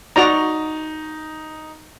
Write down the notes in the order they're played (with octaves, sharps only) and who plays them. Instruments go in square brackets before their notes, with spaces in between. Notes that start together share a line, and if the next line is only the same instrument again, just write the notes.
[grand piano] D#4 [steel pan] F#4 D5 A#5